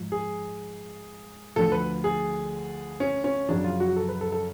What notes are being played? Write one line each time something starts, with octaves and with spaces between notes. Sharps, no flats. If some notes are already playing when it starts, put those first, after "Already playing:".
Already playing: G#2 F3
G#4
D2 D3 F3 A4
B4
G#4
C#4
C#4
F#2 C#3 F3 D4
F4
F#4
A4
B4
A4
A4